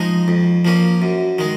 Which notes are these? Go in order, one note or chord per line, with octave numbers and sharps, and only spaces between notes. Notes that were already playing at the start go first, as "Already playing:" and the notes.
Already playing: F3 G#3 D#4
F2
F3 A#3 C#4
F#2
D#3 G#3